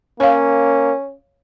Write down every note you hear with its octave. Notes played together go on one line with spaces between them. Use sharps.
A#3 C#4 C#5 F5